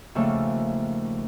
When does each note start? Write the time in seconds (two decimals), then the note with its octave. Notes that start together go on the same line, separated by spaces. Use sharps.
0.15 D#2 C#3 F3 A3 A4